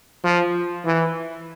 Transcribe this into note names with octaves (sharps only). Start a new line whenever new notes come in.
F3
E3